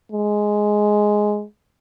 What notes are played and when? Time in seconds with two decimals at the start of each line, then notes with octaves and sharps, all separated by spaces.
0.12 G#3